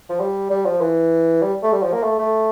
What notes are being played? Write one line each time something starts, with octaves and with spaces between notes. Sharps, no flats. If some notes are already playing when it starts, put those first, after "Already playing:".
F3
G3
G3
F3
E3
G3
A3
G3
F3
A#3
A3
A3